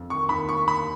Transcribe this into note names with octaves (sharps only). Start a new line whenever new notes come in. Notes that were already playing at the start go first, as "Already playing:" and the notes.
Already playing: F2
D#3 C#6
D#2 B5
D#2 C#6
D#2 B5